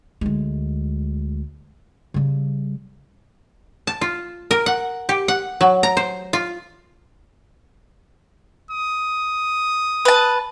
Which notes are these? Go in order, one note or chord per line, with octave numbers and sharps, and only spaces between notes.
D2 G#3
C#3 G3
A5
F4
A#4
F#5
G4
F#5
F#3
A#5
C5
F4
D#6
B4 A5